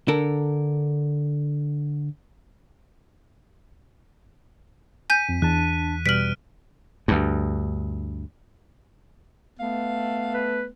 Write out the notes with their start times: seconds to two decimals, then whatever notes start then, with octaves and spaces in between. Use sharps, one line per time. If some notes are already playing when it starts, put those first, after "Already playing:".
0.08 D3 A4 A#4
5.10 G#5 G6 B6 D#7
5.29 F2
5.42 E2 D4 A5 F#6
6.06 B2 G3 B4 F6 F#6 B6 D7 F#7
7.08 D2 G2
9.60 A3 B3 F5
10.34 B4